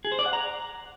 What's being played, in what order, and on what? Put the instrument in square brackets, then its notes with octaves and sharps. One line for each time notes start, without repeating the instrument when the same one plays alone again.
[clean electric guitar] G#4
C5
D5
F#5
A#5